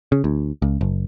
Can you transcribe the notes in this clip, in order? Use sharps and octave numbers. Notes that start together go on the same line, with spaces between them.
C#3
D2
C#2
F#1